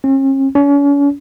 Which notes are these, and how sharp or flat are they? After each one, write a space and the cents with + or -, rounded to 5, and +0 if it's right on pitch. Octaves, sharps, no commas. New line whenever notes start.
C#4 -45
C#4 +40